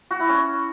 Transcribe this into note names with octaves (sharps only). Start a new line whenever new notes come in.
F#4
E4
C#4